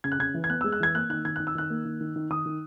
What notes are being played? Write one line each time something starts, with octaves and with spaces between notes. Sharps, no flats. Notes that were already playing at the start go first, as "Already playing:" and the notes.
C#3 G#6
F#6
C#3 G#6
E3
G#6
B3 F#6
E6
G#3
F#6
E3 G#6
A#3 F#6
D#3 F#6
D#3 G#6
D#3 F#6
E6
D#3 F#6
A#3
D#3
D#3
D#3
D#3 D#6
D#3